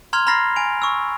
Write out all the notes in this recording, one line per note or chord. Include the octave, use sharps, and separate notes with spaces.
A#5 C6 F6 G#6 F7 G7
A#5 B5 F6 A6 A#6 C7
G#5 D7 F7
C#6 E6